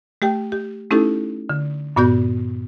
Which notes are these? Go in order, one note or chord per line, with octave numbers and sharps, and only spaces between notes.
A3 G4 G5
G4
A3 C#4 D#4 E4 G4 A4
D3
G2 A#2 B3 F#4 D5 G6